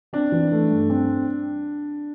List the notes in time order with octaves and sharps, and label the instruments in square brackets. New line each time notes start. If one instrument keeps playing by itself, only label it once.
[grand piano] C4 [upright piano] D4
[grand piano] E3
A3
G2
C4